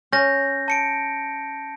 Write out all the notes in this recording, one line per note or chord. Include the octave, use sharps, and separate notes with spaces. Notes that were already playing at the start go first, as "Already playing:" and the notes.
C#4 G6 A#6
A5 C#7 D7